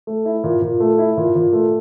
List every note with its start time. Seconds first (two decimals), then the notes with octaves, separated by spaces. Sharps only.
0.07 A3
0.25 E4
0.44 A#2
0.62 A#2
0.80 A3
0.98 E4
1.17 A#2
1.36 A#2
1.53 A3